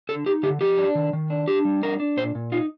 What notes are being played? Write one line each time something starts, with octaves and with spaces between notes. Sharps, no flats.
D3 A4
D#4 G4
D3 G4
F3 G4
D4
D#3
D#3
D4
D4 G4
G3
D4 A#4
D4
A#2 C5
A#2
D#4 F4